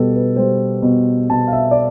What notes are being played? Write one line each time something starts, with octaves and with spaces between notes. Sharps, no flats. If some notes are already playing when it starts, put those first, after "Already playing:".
Already playing: B2 G3 A4 B4
B4
G3 C5
B2
B2 A5
F5
E5
D5